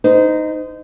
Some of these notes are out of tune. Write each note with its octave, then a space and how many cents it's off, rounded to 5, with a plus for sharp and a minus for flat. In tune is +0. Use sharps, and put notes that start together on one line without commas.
D#4 +0 C5 -35